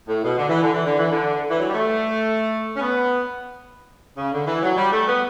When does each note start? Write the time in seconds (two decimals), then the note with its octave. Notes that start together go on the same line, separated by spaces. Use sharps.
0.07 A2
0.23 B2
0.38 D3
0.49 E3
0.62 D3
0.74 E3
0.85 D3
0.98 E3
1.09 D3
1.50 E3
1.59 F#3
1.67 G3
1.74 A3
2.76 C#4
2.81 B3
4.17 C#3
4.32 D3
4.47 E3
4.62 F#3
4.77 G3
4.92 A3
5.07 B3